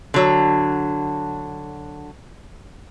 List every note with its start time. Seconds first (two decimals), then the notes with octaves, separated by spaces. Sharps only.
0.14 D3 F#3